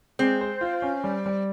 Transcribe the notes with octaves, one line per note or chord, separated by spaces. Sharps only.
G#3 C4
C5
F4
C#4
G3
G3